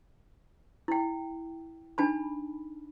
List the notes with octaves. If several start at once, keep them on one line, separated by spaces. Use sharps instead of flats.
E4 G5
D4 D#4 A5 B5